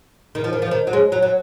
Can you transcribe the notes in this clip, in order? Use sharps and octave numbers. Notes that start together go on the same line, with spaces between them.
D#3
F3
D#3
F3
D#3
F#3
G#3
F#3
F#3